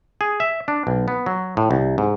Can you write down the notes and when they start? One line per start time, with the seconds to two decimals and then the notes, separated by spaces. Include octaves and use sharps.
0.21 G#4
0.40 E5
0.68 D4
0.87 B1
1.08 B3
1.26 F#3
1.57 A2
1.71 C2
1.98 G#2